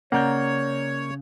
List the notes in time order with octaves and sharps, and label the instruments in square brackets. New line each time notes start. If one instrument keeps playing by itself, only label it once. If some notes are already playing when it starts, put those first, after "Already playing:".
[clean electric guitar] C#3 [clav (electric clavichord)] A#3 D5 [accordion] C#5 [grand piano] F#5 A#5 G6